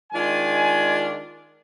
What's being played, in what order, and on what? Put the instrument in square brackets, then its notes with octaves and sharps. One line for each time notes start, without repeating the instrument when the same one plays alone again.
[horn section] D#3 G#3 D4 F4 G#5